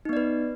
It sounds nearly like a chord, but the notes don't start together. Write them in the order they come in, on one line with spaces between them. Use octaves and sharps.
D#4 B3 D5 B4